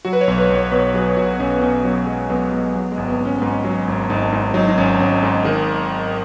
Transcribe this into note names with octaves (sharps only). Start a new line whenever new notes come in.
F#3 F#4
B4
C#5
B1
B4
B1
C#5
B2 B4
F#3 G#4
B1 F#4
B3
B1 C#4
B3
B2 C#4
F#3 B3
B1 G#3
B1 B3
B2 G#3
F#3 B3
G#3
G#1
B3
G#1
C#4
G#2 B3
C#4
F#3
G#1
G#1 D#4
G#2 D#4
F#3 D#4
D#4
G#1 C#4
G#1 C#4
G#2
D#3 G#4